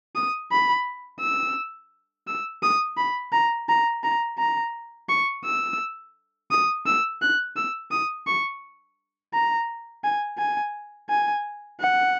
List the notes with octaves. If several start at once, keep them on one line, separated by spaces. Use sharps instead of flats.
D#6
B5
E6
E6
D#6
B5
A#5
A#5
A#5
A#5
C#6
E6
D#6
E6
F#6
E6
D#6
C#6
A#5
G#5
G#5
G#5
F#5